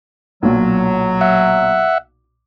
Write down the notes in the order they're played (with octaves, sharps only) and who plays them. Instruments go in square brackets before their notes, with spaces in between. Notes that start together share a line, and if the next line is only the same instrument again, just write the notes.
[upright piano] B1 A#2 [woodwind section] F#3
[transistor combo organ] E5 F#5